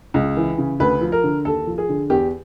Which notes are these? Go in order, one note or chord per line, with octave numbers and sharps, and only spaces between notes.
C#2
E3
C#3
D2 B4
F3
A#4
D3
D#2 A4
F3
G#4
D3
E2 G4